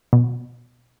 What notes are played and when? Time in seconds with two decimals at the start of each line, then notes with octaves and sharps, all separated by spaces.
0.13 B2